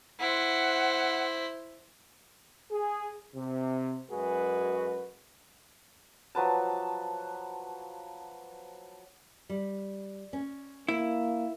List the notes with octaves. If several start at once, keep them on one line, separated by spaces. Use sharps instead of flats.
E4 C5 F#5
G#4
C3
F#2 G#3 F#4 G#4 B4
F3 F#3 B4 A5
G3
C#4
A#3 E4